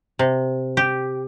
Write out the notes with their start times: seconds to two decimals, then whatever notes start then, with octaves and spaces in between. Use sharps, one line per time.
0.19 C3
0.77 G4